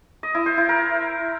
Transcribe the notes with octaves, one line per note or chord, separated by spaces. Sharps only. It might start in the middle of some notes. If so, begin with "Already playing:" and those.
D#5
E4
C5
E4
A#4